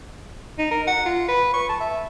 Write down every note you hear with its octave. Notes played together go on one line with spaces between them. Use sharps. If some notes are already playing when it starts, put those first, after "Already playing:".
D#4
A#4
F#5
F4
B4
C#6
A5
E5